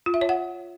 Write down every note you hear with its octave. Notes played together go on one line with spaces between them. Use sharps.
F4
E5
C#5
F#5